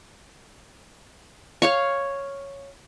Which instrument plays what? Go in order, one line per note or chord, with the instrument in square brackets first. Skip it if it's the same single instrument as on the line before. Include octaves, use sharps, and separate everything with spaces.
[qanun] C#5 F5 C#6